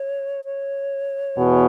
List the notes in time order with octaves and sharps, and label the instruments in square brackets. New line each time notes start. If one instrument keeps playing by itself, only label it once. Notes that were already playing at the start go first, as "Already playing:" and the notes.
Already playing: [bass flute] C#5
C#5
[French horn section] E2 B2